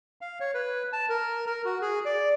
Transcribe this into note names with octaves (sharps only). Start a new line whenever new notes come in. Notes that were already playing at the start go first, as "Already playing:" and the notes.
F5
C#5
B4
A5
A#4
A#4
F#4
G#4
D5